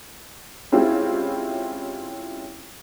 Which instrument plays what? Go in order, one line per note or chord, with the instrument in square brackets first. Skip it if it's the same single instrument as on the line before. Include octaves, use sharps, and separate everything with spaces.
[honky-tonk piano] G#3 C4 C#4 E4 F4 G4